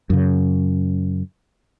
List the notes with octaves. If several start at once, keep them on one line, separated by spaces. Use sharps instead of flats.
F#2 C#3